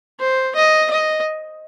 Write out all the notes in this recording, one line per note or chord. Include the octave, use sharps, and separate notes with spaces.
C5
D#5
D#5